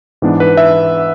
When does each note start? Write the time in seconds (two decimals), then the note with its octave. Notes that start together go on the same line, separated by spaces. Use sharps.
0.22 G#2 E3 B3 D4
0.40 B4
0.57 E5